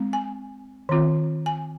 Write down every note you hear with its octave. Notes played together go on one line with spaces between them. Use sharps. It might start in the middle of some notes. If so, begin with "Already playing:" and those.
Already playing: G#3 C4
G#5
D#3 C4 F4
G#5